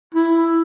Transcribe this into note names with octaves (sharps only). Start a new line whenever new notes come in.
E4